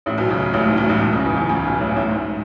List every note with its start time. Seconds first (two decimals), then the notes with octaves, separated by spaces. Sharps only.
0.06 A1 A2
0.18 B1 B2
0.30 C#2 C#3
0.54 A1 A2
0.65 G#2
0.77 B1 B2
0.89 A1 A2
1.01 B1 B2
1.13 C#2 C#3
1.25 E2 E3
1.37 C#2 C#3
1.49 C#2 C#3
1.65 B1 B2
1.80 A1 A2
1.96 A1 A2
2.08 G#2